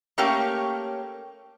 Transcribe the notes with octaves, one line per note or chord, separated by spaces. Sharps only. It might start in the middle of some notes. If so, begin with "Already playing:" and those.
A3 A#3 C#4 G4 C#5 G5